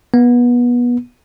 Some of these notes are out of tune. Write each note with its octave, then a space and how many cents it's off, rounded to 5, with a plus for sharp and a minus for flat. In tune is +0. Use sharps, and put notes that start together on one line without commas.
B3 -25